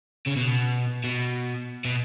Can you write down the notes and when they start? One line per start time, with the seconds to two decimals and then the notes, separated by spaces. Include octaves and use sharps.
0.26 C#3
0.36 B2
1.04 B2
1.85 B2